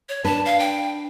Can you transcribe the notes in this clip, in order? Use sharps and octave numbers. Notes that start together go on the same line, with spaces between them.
C#5
D4 B4 A5
F5
G5